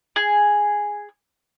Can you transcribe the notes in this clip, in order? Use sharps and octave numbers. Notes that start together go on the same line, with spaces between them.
G#4